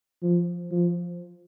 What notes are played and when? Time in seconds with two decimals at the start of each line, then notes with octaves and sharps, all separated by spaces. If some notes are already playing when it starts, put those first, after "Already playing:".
0.23 F3
0.72 F3